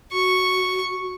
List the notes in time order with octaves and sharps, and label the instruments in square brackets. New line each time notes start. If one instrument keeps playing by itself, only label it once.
[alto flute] F#4 [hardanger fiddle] C#6